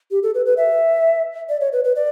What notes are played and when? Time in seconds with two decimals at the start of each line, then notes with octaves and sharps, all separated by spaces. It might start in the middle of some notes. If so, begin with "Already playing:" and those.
0.11 G4
0.23 A4
0.35 B4
0.46 B4
0.57 E5
1.49 D5
1.61 C#5
1.72 B4
1.84 B4
1.95 D5